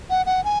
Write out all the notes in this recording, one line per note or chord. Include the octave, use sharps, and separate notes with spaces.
F#5
F#5
G#5